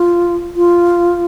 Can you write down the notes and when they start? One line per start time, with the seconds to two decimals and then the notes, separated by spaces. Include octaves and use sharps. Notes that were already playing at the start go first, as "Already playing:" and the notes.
Already playing: F4
0.56 F4